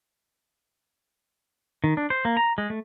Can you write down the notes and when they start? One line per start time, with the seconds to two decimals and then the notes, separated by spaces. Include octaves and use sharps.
1.84 D#3
1.97 D4
2.10 C5
2.25 A#3
2.37 A#5
2.58 G#3
2.70 A3